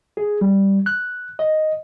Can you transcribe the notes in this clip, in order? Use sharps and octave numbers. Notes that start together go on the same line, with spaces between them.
G#4
G3
F#6
D#5